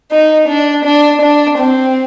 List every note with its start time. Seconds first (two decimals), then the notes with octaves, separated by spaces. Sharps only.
0.12 D#4
0.48 D4
0.85 D4
1.22 D4
1.58 C4